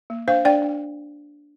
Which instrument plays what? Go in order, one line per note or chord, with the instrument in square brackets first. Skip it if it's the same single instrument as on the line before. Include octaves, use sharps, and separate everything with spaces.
[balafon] A#3
D4 C5 F5
D4 D5 G5
D4